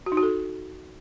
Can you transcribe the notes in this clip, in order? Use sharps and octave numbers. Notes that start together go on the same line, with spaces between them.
F#4
D#4
F#4
A4